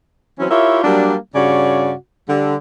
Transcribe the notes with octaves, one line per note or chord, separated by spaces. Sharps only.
E3 F#3 C4 C#4
E4 F4 G4 A#4 C#5 E5
F#3 G3 A#3 D4
G2 C#3 F#4 C#5 D5
D3 G3